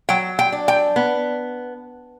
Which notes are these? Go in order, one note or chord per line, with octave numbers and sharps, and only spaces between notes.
F#3 G5
G5
D4
G5
B3